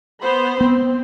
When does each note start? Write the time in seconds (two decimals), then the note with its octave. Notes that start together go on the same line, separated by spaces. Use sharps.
0.20 B3 C5 B5
0.61 B3 C4